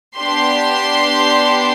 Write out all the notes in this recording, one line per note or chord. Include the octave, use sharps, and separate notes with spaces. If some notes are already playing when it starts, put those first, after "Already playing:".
B3 D4 G4 C6